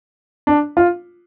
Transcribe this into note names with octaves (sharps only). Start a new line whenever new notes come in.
D4
F4